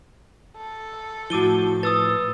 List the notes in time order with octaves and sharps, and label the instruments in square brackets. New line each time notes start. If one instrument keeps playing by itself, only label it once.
[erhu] A4
[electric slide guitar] A2 F3 [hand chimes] E4 F#4 [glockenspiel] D6 D#7 G7
[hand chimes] B4 [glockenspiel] D#6 E6 A6